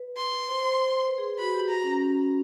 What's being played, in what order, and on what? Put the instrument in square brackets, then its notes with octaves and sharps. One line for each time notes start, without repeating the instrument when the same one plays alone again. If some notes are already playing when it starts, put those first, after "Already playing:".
Already playing: [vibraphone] B4
[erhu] C6
[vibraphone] C5
C5
B4
G#4
[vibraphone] F#4 [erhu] B5
[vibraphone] G4
[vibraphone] F#4 [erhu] A#5
[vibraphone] C#4